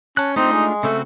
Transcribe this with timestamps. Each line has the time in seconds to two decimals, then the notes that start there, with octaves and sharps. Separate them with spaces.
0.17 C#4 A5 F#6
0.36 A3 C4 D4 D#4 F4
0.53 G#3
0.83 C#3 A3 C4 F#4